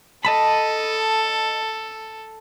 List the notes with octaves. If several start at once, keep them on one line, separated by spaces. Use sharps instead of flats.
A4 D#5 A5 B5